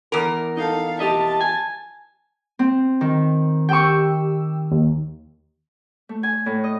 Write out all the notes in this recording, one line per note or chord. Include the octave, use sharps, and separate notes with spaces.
E2 A#4
D#4 A4 F5
G4 D#5 E5 A5
G#5
C4
D#3
G4 G5 C#6 E6
D#2
A3
G#5
A2
D#5